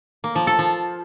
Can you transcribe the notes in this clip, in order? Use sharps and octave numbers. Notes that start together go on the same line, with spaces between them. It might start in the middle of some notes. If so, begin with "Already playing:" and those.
A#3
F3
A4
F3